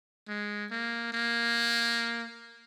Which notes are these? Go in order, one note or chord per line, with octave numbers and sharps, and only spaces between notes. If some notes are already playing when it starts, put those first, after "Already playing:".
G#3
A#3
A#3